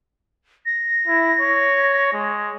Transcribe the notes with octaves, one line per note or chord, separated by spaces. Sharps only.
A#6
E4
C#5
G#3